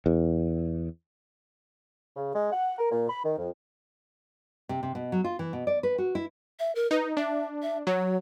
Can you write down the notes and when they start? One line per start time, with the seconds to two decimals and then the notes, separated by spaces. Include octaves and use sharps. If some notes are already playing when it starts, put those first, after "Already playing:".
0.06 E2
2.16 C#3
2.34 G#3
2.52 F#5
2.78 A#4
2.91 A#2
3.09 B5
3.24 D#3
3.38 F2
4.69 C3
4.83 C3
4.95 B2
5.12 F#3
5.24 F4
5.39 E3
5.53 B2
5.67 D5
5.83 B4
5.98 F#4
6.15 E4
6.59 E5
6.75 A#4
6.91 D#4 B4
7.17 D4 E5
7.62 E5
7.87 F#3 C#5